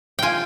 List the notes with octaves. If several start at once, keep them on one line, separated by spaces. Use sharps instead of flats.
F4 G5 G#5